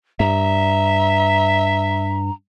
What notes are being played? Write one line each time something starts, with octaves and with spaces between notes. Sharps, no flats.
G2 E5 A#5